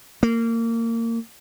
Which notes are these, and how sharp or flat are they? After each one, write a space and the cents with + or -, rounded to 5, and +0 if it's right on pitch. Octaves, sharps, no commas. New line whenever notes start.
A#3 -25